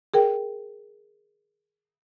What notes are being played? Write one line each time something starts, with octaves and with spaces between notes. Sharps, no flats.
G#4 A#4 G5